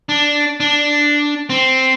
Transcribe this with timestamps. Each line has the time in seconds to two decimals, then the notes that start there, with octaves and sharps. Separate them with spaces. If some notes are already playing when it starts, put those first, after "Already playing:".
0.09 D4
0.60 D4
1.50 C4